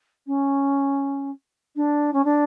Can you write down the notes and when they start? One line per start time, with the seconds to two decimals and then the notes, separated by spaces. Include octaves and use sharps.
0.26 C#4
1.76 D4
2.13 C#4
2.24 D4